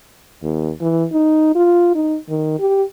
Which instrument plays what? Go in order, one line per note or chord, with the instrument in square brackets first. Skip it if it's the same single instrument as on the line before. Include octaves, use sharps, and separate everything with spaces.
[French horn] D#2
E3
D#4
F4
D#4
D#3
G4